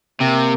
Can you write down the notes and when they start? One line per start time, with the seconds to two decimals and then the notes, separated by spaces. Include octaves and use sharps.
0.21 C3 A#3